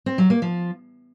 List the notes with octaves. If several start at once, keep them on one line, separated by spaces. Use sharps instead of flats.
C4
F#3
A#3
F3